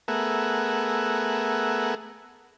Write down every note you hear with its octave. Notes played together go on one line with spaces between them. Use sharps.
A3 B3 G#4 A#4 E5 F#5